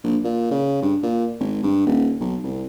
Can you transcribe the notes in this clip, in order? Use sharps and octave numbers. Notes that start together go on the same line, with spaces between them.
A#1
A#2
C#3
G2
A#2
G#1
G2
D#1
B1
C2